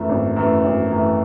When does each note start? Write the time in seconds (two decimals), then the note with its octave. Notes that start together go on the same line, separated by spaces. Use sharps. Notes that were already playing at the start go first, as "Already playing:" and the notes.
Already playing: F#2 E3 A3
0.09 G#1
0.36 F#2 E3 A3
0.64 G#1
0.92 F#2 E3 A3